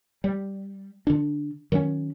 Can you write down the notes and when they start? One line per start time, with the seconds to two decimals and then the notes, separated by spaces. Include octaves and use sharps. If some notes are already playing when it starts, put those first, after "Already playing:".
0.24 G3
1.07 D3 D4
1.72 D#3 F#3 A3 C#4